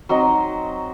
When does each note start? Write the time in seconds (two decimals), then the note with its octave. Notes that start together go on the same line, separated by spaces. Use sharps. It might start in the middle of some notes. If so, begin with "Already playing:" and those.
0.09 F#3 C4 D#4 D#5